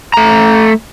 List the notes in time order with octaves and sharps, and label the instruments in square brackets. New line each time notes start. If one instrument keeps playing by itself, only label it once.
[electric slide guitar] A3 A#5